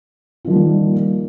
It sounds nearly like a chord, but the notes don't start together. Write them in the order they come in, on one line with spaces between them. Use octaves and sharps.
F4 D#3 F3 G3 A#3